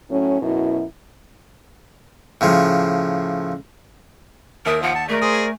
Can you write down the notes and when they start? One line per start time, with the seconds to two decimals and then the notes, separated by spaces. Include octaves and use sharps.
0.11 A2 F#3 C#4
0.42 F#2 B2 E4
2.41 A2 C#3 F3
4.66 D#2 A#4 E5 D#6
4.82 F3 F#5
4.95 A5
5.08 G#3 A3 A#4 D5
5.22 G#4 C5 D#6
5.34 G#5